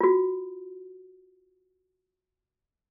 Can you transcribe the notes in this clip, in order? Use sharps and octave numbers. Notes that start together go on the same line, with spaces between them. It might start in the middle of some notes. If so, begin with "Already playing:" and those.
F4 F#4